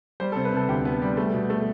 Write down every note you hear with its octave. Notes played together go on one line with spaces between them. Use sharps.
G3 C5
C3 A4
B4
C3 A4
D2 G4
B3
G3
A3
B2
A3